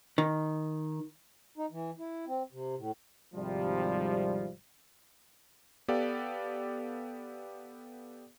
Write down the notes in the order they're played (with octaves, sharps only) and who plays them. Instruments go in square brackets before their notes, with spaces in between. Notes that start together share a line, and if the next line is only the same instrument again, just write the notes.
[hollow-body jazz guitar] D#3
[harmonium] D#4
E3
E4
C4
C3
A2
[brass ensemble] G#1 C3 F3 G3
[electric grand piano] B3 G4 A4 D5 F5